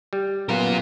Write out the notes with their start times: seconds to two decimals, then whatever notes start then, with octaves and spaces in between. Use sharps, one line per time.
0.13 G3
0.49 F#2 B3 F4 A#4